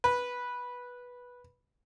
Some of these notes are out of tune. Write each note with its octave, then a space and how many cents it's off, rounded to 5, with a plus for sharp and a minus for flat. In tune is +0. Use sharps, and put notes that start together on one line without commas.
B4 -10